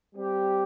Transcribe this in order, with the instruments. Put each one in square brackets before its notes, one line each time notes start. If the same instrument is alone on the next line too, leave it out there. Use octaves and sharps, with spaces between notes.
[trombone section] G3 C4 G4